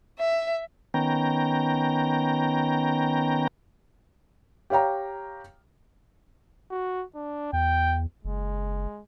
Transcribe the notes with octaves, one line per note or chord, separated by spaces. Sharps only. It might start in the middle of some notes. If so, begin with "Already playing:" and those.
E5
D#3 B3 C#4 G5 A#5
G4 C#5 F5 G5 A#5
F#4
D4
E2 G5
F#1 G#3